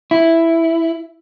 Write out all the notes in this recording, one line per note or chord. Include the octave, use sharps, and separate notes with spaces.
E4